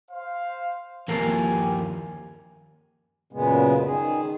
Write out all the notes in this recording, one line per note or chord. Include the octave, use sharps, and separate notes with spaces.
C5 F5
D#2 F3 A#3 G4 A4 G#5
F#2 A#2 C#3 G#3 B3
D#3 G#4